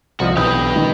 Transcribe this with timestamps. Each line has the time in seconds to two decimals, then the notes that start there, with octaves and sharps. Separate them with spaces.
0.20 C2 F3 F#4 D#5
0.37 B1 E3 G4 B4 D#6 G6
0.76 D#3